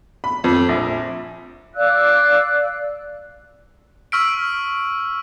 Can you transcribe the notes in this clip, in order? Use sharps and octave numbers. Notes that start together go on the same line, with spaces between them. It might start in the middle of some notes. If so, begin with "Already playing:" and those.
B5
F2
A#1
D5 F5 E6 F#6
C#6 E6 F6 B6 D7